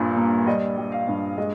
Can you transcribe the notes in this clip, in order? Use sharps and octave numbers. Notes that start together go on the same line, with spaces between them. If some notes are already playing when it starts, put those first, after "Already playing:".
Already playing: A#1 G2 A#2
A#3
G3 D#5
G3
F5
G2
G#3 D#5